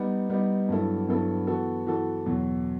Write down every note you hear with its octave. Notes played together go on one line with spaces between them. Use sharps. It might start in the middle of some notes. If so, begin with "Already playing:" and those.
Already playing: G3 B3 D#4
G3 B3 D#4
G2 F#3 B3 E4 A4
G2 F#3 B3 E4 A4
E3 B3 F#4 A4
E3 B3 F#4 A4
E2 B2 F#3